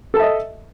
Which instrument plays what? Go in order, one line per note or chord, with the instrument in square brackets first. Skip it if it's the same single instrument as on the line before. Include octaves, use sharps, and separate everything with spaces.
[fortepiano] A4
A5
E5
D#5